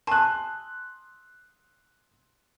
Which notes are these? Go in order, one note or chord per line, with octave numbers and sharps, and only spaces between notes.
G#5 A5 C6 F#6